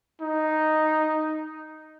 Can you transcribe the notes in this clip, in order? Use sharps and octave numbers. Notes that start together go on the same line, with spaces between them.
D#4